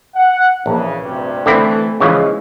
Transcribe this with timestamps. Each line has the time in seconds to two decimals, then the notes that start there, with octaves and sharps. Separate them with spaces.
0.15 F#5
0.66 A#1 C#3 E3
1.03 D2 G2 C3
1.46 D3 E3 A3 C4 E4
2.00 C#3 E3 F3 G#3